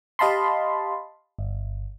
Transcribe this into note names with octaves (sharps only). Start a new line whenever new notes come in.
G4 D#5 F5 A5 B5 C6
G1